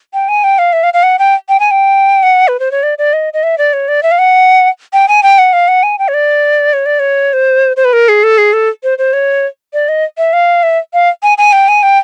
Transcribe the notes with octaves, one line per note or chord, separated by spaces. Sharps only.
G5
G#5
G5
F5
E5
F5
F5
F#5
G5
G5
G#5
G5
F#5
B4
C5
C#5
D5
D5
D#5
D#5
E5
D5
C#5
D5
E5
F5
F#5
G5
G#5
G5
F#5
F5
F#5
G#5
G5
C#5
D5
C#5
D5
C#5
C5
C5
B4
A#4
G#4
A4
G#4
A4
C5
C5
C#5
D5
D#5
E5
F5
E5
F5
G#5
G#5
G5
G#5
G5